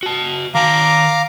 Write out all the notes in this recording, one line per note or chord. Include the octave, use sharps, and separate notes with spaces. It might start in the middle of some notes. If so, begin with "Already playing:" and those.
F#4 A5
D#3 F5 A5 A#5 D6